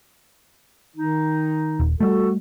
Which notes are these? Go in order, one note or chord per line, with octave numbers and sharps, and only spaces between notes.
D#3 D#4
D#1
G3 A3 F#4 A4